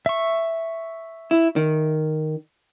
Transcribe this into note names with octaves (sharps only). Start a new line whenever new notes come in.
E5 C#6
E4
D#3